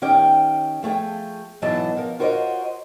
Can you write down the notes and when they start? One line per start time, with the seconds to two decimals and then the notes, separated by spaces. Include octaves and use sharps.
0.02 D#3 C#4 G4 G5
0.83 F3 A3 G#4 G5
1.62 G#2 B2 E3 F#3 D#5 A5
1.97 F3 A#4
2.19 F4 F#4 A#4 C5 C#5 D#5